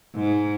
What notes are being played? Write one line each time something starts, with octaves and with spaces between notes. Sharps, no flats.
G#2